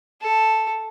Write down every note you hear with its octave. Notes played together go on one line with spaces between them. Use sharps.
A4